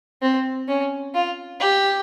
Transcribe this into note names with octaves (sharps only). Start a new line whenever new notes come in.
C4
C#4
F4
G4